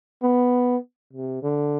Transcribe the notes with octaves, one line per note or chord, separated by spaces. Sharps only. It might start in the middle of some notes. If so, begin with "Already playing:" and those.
B3
C3
D3